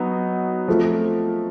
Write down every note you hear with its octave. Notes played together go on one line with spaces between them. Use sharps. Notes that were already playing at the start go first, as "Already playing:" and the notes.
Already playing: F#3 B3 D#4 F#4
F3 A3 C4